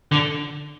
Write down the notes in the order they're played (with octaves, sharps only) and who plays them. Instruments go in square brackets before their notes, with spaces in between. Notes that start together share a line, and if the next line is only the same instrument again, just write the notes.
[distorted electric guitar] D3